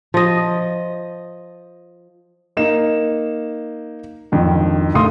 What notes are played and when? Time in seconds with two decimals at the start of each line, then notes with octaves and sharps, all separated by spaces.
0.14 F3 D#5
2.57 A#3 D#4 E7
4.32 G#1 F2 D3 D#3
4.94 F#1 A3 F5 C6 D#6